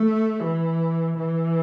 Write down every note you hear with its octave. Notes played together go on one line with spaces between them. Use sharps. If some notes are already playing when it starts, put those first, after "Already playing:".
Already playing: A3
E3
E3